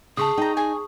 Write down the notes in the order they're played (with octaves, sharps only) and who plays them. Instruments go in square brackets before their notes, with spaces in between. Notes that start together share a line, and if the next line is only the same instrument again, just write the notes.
[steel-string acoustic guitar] C#3 [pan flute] G#4 [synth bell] A5 C#6 D#6
[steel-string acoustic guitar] D#4 [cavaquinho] G5 A#5
[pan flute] G#4 [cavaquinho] G#5